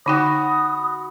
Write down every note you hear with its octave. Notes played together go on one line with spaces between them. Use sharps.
D3 D#4 F#4 G5 B5 D#6